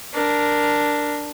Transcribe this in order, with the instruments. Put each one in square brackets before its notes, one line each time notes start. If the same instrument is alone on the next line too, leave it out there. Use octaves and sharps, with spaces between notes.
[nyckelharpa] D4 A#4